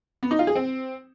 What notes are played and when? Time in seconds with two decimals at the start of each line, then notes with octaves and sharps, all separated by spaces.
0.23 B3
0.31 D#4
0.39 F4
0.47 G#4
0.55 C4